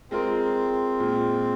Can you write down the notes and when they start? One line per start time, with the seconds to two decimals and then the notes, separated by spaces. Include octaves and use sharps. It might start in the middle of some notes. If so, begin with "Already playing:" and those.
0.11 G#3 C4 F4 A#4
1.00 A#2 G#3 F4